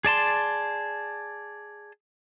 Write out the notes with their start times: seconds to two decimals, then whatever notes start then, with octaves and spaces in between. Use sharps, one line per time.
0.05 G#4 D5 A5 C6